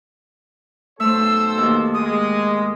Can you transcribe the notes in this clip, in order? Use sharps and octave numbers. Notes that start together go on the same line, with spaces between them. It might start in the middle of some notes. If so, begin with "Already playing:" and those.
B1 A3 A4 C5 E6
D#2
G#3 D#6